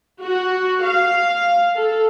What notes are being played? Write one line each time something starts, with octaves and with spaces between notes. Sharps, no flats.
F#4
F5
A4